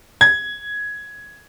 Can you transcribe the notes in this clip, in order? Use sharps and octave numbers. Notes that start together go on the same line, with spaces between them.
G#6